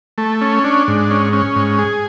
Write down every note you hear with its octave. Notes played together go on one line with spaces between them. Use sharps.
A3
C#4
D4
G#2
C#4
C#4
G#2
G#4